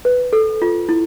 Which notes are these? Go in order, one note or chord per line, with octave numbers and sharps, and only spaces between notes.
B4
A4
F4
E4